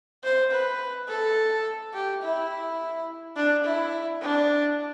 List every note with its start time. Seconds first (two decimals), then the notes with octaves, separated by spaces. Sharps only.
0.24 C5
0.52 B4
1.08 A4
1.94 G4
2.23 E4
3.36 D4
3.65 E4
4.21 D4